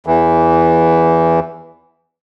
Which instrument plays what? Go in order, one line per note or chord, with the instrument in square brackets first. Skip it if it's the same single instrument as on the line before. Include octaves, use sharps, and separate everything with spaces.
[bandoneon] E2 E3